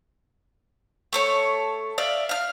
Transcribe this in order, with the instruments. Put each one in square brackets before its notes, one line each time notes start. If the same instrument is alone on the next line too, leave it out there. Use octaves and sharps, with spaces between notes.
[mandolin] A3 A4 C#5
D5 E5 F5
F5 F6